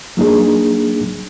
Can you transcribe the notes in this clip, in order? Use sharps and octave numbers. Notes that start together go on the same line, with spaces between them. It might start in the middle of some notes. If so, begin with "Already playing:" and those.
F#3 A#3 D4 D#4 G#4